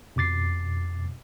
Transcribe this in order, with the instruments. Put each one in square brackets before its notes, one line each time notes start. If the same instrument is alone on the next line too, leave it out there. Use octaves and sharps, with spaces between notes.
[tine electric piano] F2 B2 D6 A6 C7